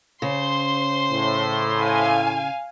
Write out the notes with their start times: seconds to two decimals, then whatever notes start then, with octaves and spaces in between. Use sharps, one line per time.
0.22 C#3 C5 C6
1.12 A2
1.79 F5 G#5